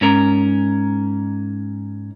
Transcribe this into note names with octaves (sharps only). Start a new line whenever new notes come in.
G#2 C#4 A#4